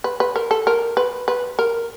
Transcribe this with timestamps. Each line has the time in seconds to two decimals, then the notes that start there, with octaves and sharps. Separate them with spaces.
0.04 B4
0.20 B4
0.36 A#4
0.51 A4
0.67 A#4
0.97 B4
1.28 B4
1.59 A#4